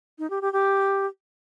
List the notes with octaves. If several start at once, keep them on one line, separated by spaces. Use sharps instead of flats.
D#4
G4
G4
G4